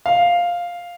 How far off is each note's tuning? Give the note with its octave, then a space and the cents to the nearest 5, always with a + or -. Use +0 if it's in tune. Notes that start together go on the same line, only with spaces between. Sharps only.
F5 +5